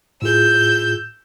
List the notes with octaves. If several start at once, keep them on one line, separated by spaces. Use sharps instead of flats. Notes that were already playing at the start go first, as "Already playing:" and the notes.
A2 F4 G#4 E6 G6